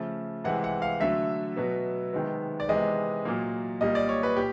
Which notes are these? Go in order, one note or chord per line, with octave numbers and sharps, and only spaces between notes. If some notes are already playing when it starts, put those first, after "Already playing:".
Already playing: C#3 F3 A3
C3 E3 G#3 F#5
F#5
F5
D3 F#3 A3 E5
B2 F#3 B3
C3 D#3 G#3 B3
D5
C3 E3 G#3 B3 D#5
A#2 F#3 A#3
A#2 G3 A#3 D#5
D5
C#5
B4
A#2 G4